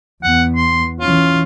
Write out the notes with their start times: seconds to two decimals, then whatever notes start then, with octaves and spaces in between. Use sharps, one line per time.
0.23 E2 B3 F#5
0.56 C6
1.00 E3 C#4 F4